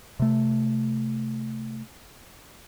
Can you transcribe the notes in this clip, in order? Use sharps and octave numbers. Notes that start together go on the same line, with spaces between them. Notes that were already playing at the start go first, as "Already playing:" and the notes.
C3 A3